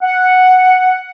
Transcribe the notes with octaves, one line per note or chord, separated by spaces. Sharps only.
F#5